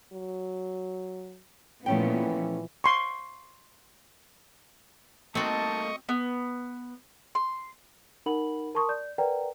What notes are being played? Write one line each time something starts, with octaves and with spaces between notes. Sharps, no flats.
F#3
A#2 E3 F3 A3 B3 C#4 G5
C6 C#6
A3 A#3 C4 D#4 F#4 D#5 A5 C#6
B3
C6
D#4 A#4 F#5 B5 F#7
A#4 A5 C6 C#6 D#6
D5 G6
A#4 B4 D5 F#5 G5 A#5